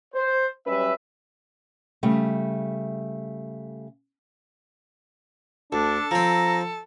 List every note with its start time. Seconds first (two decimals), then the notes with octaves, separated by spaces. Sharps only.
0.15 C5
0.66 F#3 G3 C#4 B4 E5
2.03 C#3 G3 A3
5.73 D2 D4 A4
6.11 F3 C4 A#5